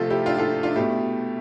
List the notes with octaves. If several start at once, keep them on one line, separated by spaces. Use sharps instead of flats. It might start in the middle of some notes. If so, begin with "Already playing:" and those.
Already playing: C3 F3 A3 F4 A4
E4 G4
D4 F4
F4 A4
D4 F4
B2 A3 E4 G4